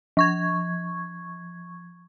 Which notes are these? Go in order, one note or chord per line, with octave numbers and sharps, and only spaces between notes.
F3 C#6 G#6